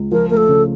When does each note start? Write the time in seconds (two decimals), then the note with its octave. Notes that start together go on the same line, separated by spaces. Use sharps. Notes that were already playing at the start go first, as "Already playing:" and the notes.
Already playing: C#2
0.12 F3 A#4
0.30 A3 A#4
0.37 A4
0.49 C#3